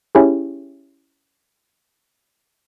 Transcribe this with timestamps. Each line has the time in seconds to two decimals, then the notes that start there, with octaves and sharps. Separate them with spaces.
0.15 C#4 E4 G4 G#4